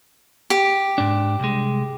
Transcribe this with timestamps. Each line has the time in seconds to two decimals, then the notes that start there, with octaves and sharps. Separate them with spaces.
0.50 G4
0.98 G#2 D4
1.40 C2 G#3